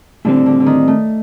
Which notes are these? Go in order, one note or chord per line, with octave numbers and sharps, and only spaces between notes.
A2 D3 G3 C4
D3
D3
D#3
A3